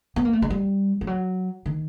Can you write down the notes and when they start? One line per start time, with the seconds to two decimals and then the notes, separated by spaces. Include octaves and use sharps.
0.16 B3
0.25 A#3
0.33 A3
0.42 G#3
0.50 G3
1.01 F3
1.07 F#3
1.66 D#3